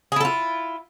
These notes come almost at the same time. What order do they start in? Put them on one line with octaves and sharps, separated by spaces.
G#4 E4 A4 F4